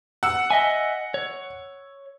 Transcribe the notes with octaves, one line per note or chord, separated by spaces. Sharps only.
F#5 E6
D#5 E5 G#5
C#5